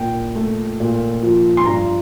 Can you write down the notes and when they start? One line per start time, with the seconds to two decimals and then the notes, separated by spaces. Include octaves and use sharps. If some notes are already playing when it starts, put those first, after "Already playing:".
Already playing: A#2 G5
0.35 A3
0.80 A#2
1.23 F3
1.57 C6
1.66 G2 A#5